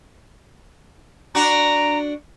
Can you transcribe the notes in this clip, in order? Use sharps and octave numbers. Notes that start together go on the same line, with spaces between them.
D4 F#4 A#5